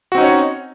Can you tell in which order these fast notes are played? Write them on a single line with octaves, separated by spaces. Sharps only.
F#4 C4 D#4 C#4 C#5